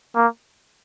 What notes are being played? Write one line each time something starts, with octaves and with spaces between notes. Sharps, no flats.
A#3